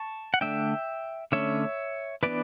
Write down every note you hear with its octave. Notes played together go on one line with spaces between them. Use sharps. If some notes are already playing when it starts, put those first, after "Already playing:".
Already playing: A5 C#6
F#5
D3 A3 D4 E5 G5
D3 A3 C#4 C#5 E5
E3 B3 D4 B4 D5